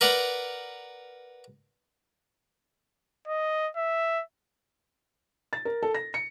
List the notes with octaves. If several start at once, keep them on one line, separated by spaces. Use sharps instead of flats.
A#4 B4 D5 F#5 A#5
D#5
E5
A6
A#4
A4
A#6
C#7